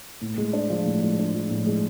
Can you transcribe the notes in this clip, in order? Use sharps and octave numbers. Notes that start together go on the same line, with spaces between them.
A2
G#3
D4
F3
A2
G#3
D4
F3
A2
G#3